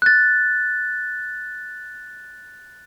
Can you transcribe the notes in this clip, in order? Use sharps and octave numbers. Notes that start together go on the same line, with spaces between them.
F#6 A6